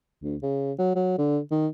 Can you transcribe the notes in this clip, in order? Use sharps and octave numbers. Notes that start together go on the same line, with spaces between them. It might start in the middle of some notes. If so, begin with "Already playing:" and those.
D2
C#3
F#3
F#3
D3
D#3